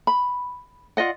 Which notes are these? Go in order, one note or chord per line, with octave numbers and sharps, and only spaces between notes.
B5
F4 D5 D#5 F#5